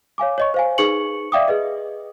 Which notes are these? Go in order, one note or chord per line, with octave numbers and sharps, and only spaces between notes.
C#5 F5 G#5 D6
C#5 D#5 C#6
C5 F5 G#5
D#4 G#4 B4 C#6 C#7 F#7
D5 E5 F5 G5 D6 D#6
G#4 B4 D#5